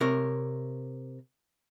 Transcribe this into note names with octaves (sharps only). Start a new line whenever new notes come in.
C3 A#4 C#5